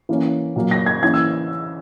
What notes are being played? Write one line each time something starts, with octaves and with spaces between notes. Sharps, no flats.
E3 A#3 C#4
A#2 F#3 A#3
A#6
G#6
E3 A#3 C#4 G#6
E6